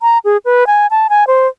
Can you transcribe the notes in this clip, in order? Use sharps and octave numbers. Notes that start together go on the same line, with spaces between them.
A#5
G#4
B4
G#5
A5
G#5
C5